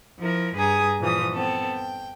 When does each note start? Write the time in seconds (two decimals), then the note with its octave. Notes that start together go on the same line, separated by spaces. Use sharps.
0.20 F3 E4 A#4
0.55 G2 G#4 B4 G#5 A#5 D#6
1.00 A#2 E3 F3 D#6
1.33 B3 C4 A4
1.76 G5